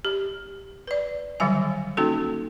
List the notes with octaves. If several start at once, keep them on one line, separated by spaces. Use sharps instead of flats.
G4
B4 D5
D3 D#3 F#3 G3 F5 G#5
A#3 C#4 D#4 F#4 A4